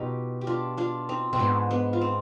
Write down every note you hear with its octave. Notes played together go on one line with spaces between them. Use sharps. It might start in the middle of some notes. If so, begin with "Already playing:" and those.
Already playing: B2 D#4 F4 G4
G4
D4 F4
D4 F4
C4 D#4
B2 C4
G#2 B3 D4
B3 D4
F4
C4 D#4